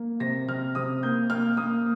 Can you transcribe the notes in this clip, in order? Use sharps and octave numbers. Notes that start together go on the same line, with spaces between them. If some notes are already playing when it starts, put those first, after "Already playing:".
Already playing: A#3
C3 A#6
C3 F6
C3 D#6
A#3 G6
A#3 F6
A#3 D#6